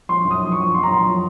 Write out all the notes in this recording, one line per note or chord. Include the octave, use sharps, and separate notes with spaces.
F3 C6
F#2
D#6
F3
C#6
F3
F3 C6
A#5
F#2 C6
F3